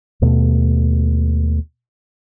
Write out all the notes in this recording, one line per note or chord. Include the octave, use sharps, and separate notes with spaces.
D#2 B2 A3